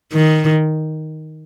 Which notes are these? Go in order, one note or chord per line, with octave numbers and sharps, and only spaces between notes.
D#3